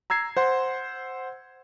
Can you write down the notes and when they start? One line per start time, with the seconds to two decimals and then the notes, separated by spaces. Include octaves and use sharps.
0.10 A#5 E6 G#6 C7
0.37 C5 F#5 C6